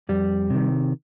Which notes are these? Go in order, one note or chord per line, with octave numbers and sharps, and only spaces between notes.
F2 G3
C3 D#3